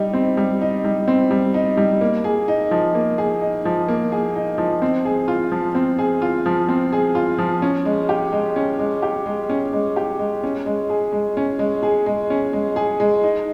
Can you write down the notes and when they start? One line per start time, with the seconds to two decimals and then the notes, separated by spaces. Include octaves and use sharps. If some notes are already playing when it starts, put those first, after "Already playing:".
Already playing: G3 D#4
0.13 C4
0.37 G3
0.61 D#4
0.85 G3
1.08 C4
1.31 G3
1.54 D#4
1.77 G3
2.01 A#3
2.24 G#4
2.48 D#4
2.71 F3
2.95 A#3
3.18 G#4
3.41 D#4
3.65 F3
3.88 A#3
4.12 G#4
4.36 D#4
4.58 F3
4.82 C4
5.05 G#4
5.28 F4
5.52 F3
5.75 C4
5.99 G#4
6.22 F4
6.46 F3
6.69 C4
6.92 G#4
7.15 F4
7.38 F3
7.62 C#4
7.85 G#3
8.09 G4
8.33 G#3
8.56 C#4
8.79 G#3
9.02 G4
9.26 G#3
9.49 C#4
9.73 G#3
9.96 G4
10.19 G#3
10.43 C#4
10.66 G#3
10.90 G#4
11.13 G#3
11.37 C#4
11.59 G#3
11.83 G#4
12.06 G#3
12.30 C#4
12.53 G#3
12.76 G#4
13.00 G#3
13.24 D#4